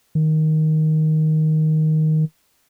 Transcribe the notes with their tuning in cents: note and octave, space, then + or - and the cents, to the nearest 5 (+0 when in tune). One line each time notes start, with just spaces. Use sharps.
D#3 +5